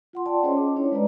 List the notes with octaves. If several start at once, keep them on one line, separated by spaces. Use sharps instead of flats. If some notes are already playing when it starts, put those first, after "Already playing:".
F4 F#5 C6
D5 G5 A5 C6
C#4 G#4 C5 C#5 D#5
D6
D4 E4 C#5
G#3 B4 D5 A#5